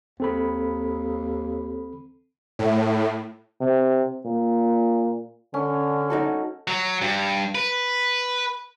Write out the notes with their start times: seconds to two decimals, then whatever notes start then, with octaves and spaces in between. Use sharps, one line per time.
0.20 D#2 C4 A4 B5
2.59 A2
3.61 C3
4.25 A#2
5.54 D3 C#4
6.10 D#4 F#4 A4
6.68 F#3
7.02 G2
7.55 B4